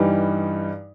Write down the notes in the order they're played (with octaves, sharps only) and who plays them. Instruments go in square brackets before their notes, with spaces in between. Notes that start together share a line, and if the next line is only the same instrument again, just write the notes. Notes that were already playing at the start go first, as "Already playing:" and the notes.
Already playing: [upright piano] G2 E3 G3 D#4